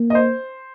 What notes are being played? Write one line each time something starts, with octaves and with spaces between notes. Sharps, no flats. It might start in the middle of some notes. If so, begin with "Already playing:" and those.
Already playing: A#3
D#5
C5